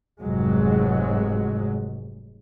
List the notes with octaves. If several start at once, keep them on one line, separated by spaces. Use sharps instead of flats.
F1 G#2 F#3 G#3